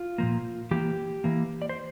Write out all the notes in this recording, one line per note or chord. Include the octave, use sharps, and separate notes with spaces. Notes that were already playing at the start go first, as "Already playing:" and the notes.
Already playing: F4
A#2 F3 A#3
E3 A#3 G4
E3 A#3
D5
C5